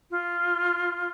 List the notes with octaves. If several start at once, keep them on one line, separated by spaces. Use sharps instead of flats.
F4